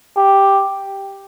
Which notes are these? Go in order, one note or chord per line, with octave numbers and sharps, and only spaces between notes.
G4